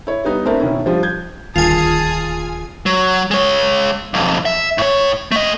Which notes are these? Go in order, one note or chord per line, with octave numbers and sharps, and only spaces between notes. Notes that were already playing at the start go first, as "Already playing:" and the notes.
E4 C#5
G3 B3 D#4
A3 C4 D4 E4 A#4 E5
B2 D#3 C#4 E4
F3 G3 F4
G6 G#6
D#1 D2 D#3 F4 G#4 G#5 A5 D#6
F#3
G#3 C#5
B1 F2
E5
A2 C#5
A3 D#5